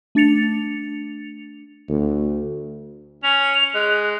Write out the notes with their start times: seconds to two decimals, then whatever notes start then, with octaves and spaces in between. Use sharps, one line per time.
0.15 A3 D4 A6 C#7 F7
1.89 D2
3.23 C#4 F7
3.75 G#3 F#6